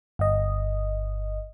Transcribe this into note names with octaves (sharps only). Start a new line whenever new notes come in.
G1 D#5